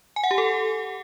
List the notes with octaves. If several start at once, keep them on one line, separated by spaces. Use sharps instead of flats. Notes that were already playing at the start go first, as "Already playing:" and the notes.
G#5
F#5
G4
A4